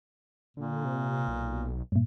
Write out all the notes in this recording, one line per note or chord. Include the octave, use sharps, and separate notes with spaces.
A#2 D3
C3
B1
G2 A#2